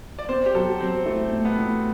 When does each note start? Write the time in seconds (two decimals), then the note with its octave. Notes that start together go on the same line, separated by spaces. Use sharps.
0.19 D5
0.29 C4 C5
0.46 G4
0.55 F#3 A4
0.80 F#3 C4
1.06 A3 E4
1.32 A2
1.45 B3
1.58 A2